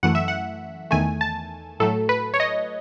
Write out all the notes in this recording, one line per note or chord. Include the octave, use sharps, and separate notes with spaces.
F#2 E3 A3 F#5
E5
F#5
E2 D#3 A3 G#5
A5
A2 F#3 A3 A4
B4
C#5
D#5